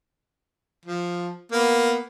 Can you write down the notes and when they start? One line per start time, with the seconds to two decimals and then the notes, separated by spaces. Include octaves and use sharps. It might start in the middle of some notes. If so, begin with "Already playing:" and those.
0.86 F3
1.52 A#3 B3